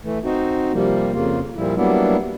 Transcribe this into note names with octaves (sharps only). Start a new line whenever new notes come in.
E3 A3
C4 D#4 F#4
C3 F3 G3 A#3
F2 C#3 A#3 F4
A#2 F3 G3 E4
F#3 G3 A#3 B3 D4 E4